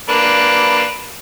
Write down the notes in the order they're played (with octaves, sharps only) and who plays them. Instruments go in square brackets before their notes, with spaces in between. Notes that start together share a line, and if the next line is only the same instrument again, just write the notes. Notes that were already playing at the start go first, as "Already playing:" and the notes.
[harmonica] A#3 D4 B4